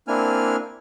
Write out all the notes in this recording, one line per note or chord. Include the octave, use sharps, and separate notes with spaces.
A#3 C4 D4 E4 G#5 F6